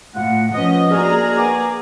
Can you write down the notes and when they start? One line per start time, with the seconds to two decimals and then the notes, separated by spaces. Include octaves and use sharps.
0.15 A2 F4 F#5
0.53 F3 B3 C#4 F4 D#5 D#6
0.90 A#3 D4 F#4 G#4 A#4 A#5
1.37 B3 G#5 D6